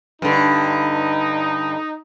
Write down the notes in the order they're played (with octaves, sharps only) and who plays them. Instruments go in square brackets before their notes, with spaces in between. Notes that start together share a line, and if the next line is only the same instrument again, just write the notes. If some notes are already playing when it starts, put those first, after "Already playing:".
[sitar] G2 D3 [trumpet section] D#4